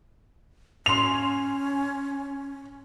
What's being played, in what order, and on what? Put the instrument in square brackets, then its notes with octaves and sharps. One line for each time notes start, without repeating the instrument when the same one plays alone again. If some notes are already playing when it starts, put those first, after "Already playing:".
[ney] C#4 [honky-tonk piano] C6 F7